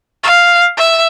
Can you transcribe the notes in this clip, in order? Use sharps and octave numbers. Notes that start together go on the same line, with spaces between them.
F5
E5